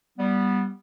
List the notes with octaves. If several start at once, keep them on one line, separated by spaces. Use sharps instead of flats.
G3 B3